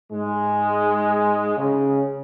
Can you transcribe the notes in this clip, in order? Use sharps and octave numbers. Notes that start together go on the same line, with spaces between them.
G#2 G#3
C#3